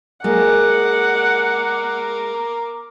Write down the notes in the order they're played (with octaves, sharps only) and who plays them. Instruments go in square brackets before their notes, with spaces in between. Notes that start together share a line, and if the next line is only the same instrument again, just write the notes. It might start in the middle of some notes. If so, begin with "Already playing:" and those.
[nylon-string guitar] G#3 A#3 [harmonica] A#4 D6 [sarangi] F#5